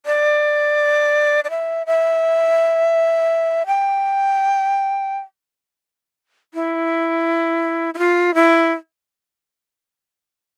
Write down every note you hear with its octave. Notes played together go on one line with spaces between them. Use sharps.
D5
D5
E5
E5
G5
E4
E4
F4
E4